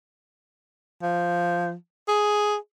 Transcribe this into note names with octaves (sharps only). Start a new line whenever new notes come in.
F3
G#4